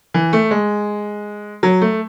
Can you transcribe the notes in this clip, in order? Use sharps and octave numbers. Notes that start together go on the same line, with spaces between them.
E3
A3
G#3
F#3
A3